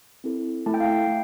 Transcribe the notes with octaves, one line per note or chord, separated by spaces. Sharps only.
C4 E4 A4
A3 E4 A4 A5
G5
F5
G5
A3